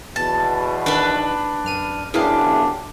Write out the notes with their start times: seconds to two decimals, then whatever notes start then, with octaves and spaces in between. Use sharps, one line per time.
0.16 E2 B2 A5
0.86 D#3 D4 B4
1.65 F#2 F6 D#7
2.14 F#2 B3 D4 E4 G4 G#4 F5